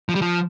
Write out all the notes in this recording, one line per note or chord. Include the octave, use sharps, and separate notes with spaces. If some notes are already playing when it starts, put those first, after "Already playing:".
F3
G3
F3